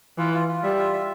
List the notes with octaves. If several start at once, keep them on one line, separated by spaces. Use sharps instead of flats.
E3 F4
F4
F4
G3 E5
F4
E5